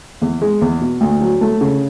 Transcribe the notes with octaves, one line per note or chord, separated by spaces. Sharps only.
E2
G#3
E2
B2
D2
F#3
A3
C#3